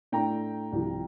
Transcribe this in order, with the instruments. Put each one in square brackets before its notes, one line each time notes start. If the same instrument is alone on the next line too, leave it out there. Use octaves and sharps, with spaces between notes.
[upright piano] A2 A3 D4 G5 A#5
C2 C3 F3